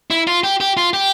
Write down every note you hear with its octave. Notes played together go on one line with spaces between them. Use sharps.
E4
F4
G4
G4
F4
G4